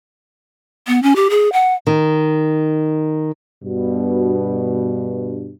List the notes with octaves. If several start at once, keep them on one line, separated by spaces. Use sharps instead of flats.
B3
C#4
G4
G#4
F#5
D#3
G2 B2